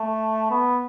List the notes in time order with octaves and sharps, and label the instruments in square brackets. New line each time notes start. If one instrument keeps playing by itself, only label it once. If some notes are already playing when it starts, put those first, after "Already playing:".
Already playing: [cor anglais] A3
B3